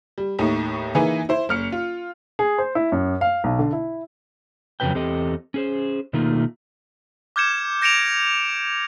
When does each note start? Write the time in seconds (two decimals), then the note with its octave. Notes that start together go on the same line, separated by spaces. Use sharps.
0.18 G3
0.39 D#2 A2 D#4
0.95 E3 A#3 D#4 G#4 B4
1.29 E4 C5
1.49 F#1 F6 C#7
1.72 F4
2.39 G#4
2.58 C5
2.75 E4
2.92 F#2
3.21 F5
3.44 B1
3.59 D3
3.73 E4
4.80 F2 C#3 E3 F#3 B4 G5
4.95 E2 C4 G4 A4 D#5
5.54 C#4 G#4 C5
6.13 B2 D#3 A3 A#3 D#4 F4
7.36 D6 F6 G6 G#6 C#7 E7
7.82 G6 A#6 C#7 D7 E7 F7